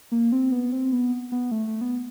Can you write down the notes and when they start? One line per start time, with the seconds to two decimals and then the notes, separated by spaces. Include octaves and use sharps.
0.12 A#3
0.32 C4
0.52 B3
0.72 C4
0.92 B3
1.32 B3
1.51 A3
1.67 A3
1.81 B3